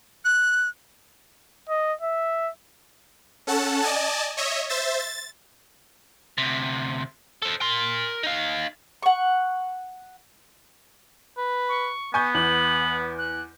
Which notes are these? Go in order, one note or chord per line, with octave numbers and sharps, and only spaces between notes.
F#6
D#5
E5
C#4 A4 F#5 A5
D5 D#5 G#5 A5
C#5 D#5 E5
C5 E5 A6
A6
D2 C3
A4 C5
A#4 C6
D#4 F5
F#5 C#6
B4
C#6
B3 G#5 C#6 G6
E2 F#7
F#6